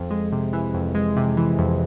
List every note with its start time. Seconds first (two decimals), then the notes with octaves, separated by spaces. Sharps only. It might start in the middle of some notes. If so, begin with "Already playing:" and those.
Already playing: F2
0.11 G#3
0.32 C3
0.53 E3
0.74 F2
0.95 G#3
1.17 C3
1.37 E3
1.59 F2